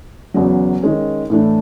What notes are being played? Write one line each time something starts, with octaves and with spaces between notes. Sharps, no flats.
E2 C#3 F#3
D#3 G#3 C#4
A2 E3 A3 D4